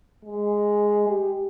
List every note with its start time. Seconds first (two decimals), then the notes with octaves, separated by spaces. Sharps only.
0.25 G#3
1.09 G4